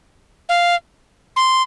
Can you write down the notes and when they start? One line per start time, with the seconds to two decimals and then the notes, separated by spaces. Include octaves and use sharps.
0.49 F5
1.36 C6